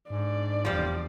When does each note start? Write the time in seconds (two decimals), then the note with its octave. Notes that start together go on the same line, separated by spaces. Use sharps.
0.10 G#2 D4 D5
0.65 F1 E2 F3 G3